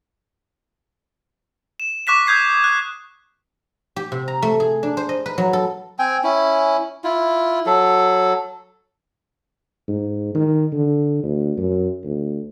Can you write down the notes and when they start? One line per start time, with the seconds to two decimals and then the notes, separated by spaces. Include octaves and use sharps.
1.80 E7
2.07 C#6 D6 F#6 B6 E7
2.27 D#6 G6 G#6 C7
2.64 F#6
3.96 G4
4.12 C3
4.28 A#5
4.42 A3
4.60 G#4
4.83 D4
4.97 C5
5.09 D#5
5.26 B4
5.38 F#3
5.53 A4
5.99 C4 G5 G#5
6.23 C#4 E4
7.04 E4 F4
7.66 F#3 A4
9.88 G#2
10.35 D#3
10.73 D3
11.23 D2
11.58 F#2
12.04 D2